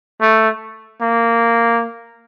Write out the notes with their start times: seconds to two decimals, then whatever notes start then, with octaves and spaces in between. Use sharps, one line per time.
0.21 A3
1.01 A#3